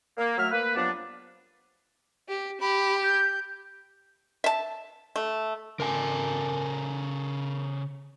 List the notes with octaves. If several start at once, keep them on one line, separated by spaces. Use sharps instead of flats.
A#3
F#3 A3 E5 F6
A#3 B4
G2 F3 F#3 B3 D4
G4
G4 B5
G6
E5 A5
A3
C#3 A4 A#4 G#5